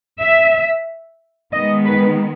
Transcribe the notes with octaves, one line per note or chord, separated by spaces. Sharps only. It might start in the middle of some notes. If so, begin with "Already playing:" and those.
E5
D#3 G#3 B3 D#5
B4